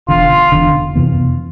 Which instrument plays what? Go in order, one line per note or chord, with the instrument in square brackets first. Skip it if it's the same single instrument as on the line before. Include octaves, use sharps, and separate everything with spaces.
[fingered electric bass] E1 E2 D3 [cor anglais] F4
[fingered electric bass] E1 E2 D3
F2 C3 E3 B3